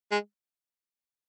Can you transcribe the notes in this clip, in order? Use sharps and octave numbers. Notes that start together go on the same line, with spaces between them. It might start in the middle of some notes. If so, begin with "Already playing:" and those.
G#3